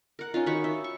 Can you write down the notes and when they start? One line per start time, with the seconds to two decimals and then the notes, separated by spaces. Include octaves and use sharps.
0.19 A#4 F#5
0.34 C#4 D#4 F4
0.46 D#3 F#4 B5 C#6
0.64 E5
0.84 C#6